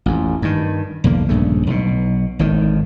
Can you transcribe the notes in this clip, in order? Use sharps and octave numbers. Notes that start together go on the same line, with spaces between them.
A1 F2
G2 D#3
B1 E2 D3 A#3
A#1 G2 C#3 A3
B1 B2
G#1 A2 D#3